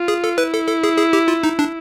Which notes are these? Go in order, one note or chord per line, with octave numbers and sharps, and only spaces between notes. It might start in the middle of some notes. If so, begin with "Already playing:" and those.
Already playing: F4
G#4
A4
E4 B4
A4
A4
G#4
G#4
G4
F4
D#4
D4